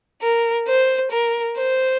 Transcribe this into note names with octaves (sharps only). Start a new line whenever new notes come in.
A#4
C5
A#4
C5